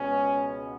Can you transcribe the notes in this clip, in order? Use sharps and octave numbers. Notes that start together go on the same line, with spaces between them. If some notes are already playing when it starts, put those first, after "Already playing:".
Already playing: C#2 B2 G#3 B3 C#4